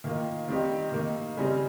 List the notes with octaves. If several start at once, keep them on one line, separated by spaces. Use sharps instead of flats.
D#3 A#3 F4
D#3 G3 C4 D#4 G4
D#3 A#3 D#4
C#3 G3 C4 D#4